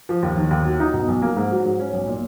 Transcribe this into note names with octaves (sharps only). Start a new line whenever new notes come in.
F3
D#2
D#3
D#2
F#3
D#4
B2
B1
A#3
G#2
F#3
G#2
C#4
B1
A#2